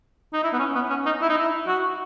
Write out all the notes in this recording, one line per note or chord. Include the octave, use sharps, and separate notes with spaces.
D#4
E4
B3
C#4
B3
C#4
D#4
E4
D#4
E4
F#4